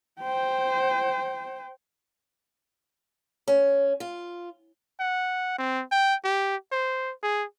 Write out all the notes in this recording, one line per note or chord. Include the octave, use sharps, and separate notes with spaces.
C5 G5
C#4
F4
F#5
C4
G5
G4
C5
G#4